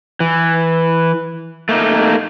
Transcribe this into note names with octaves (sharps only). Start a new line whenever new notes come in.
E3
A3 A#3 D#4